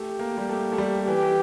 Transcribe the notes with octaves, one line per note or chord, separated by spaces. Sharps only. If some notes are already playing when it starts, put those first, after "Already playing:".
Already playing: A3 G4
A#3
G3
A3
A3
G3
E3 G4
E3